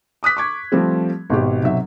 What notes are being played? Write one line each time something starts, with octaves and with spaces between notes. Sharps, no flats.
D6 D#6 F#6 B6
C#6 D6 G#6
F3 G3 A3 C4 G4
G#1 B2 G4
B1 C3 F#3 E5